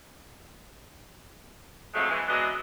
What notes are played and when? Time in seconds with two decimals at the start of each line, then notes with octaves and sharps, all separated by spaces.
1.95 F2 F3 F#3 G#3 A3
2.10 E3 G#3
2.28 F#3 G#3 B3 D4 F#4 D#5